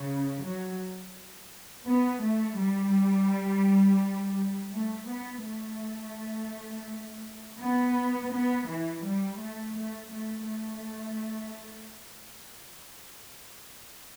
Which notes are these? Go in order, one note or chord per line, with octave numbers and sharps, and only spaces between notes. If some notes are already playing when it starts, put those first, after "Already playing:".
Already playing: C#3
F#3
B3
A3
G3
A3
B3
A3
B3
B3
E3
G3
A3
A3
A3
A3